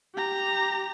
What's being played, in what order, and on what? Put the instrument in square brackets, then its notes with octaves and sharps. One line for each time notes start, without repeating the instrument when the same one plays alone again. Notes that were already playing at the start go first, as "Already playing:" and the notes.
[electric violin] G4 A#5